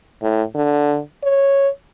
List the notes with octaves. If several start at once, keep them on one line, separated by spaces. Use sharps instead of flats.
A2
D3
C#5